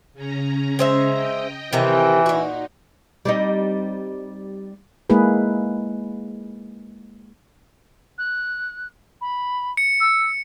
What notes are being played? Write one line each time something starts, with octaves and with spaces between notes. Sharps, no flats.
C#3 C#4 A#5
G#3 C5 E5
D#5 G5
C3 D#3 E3 A#5
A#2 D#4 F#4
G3 C4 D#4
G#3 A#3 E4 G#4 B4
F#6
B5
C#7
E6